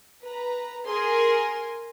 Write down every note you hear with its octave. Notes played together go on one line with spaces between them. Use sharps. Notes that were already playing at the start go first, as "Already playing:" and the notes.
B4 A#5
G#4 A#4 G#5 C6